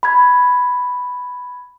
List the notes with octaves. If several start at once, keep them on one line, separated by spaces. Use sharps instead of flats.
B5 G#6